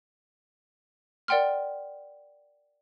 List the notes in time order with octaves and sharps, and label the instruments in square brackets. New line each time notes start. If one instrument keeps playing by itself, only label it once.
[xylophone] A#4 D5 F#5 G5 C6 F6